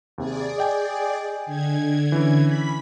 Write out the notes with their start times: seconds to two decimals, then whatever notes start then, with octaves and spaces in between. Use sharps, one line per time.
0.18 D#2 C3 G#4 D5
0.58 D#5 G5 G#5
1.46 D3 G#6
2.12 E3 C#4 E4
2.45 B5 B6